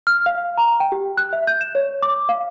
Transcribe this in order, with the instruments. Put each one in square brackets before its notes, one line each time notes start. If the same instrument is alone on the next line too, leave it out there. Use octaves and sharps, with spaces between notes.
[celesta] F6
F5
A#5
G5
G4
F#6
E5
G6
E7
C#5
D6
F5